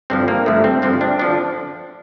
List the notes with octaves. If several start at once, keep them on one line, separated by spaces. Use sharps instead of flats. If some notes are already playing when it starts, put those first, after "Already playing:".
G2 D3 F3 C4
A#3
G2 D3 F3 A3
C4
G2 D3 F3 C4
D4
D3 F3 D4